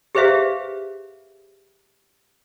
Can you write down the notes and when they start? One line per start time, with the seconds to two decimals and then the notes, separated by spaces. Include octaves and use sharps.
0.15 G4 G#4 B4 C5 E5 F5